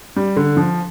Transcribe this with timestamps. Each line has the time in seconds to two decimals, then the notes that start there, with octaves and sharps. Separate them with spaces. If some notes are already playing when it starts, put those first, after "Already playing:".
0.16 G3
0.36 D3
0.57 F3